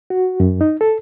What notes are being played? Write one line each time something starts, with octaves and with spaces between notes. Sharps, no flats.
F#4
F#2
D#4
A4